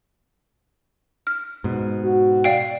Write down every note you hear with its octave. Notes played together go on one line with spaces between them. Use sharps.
F6
G#2 B2
F#4
D5 F5 G5